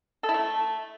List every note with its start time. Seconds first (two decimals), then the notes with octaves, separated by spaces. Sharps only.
0.23 A4
0.29 E4
0.34 A3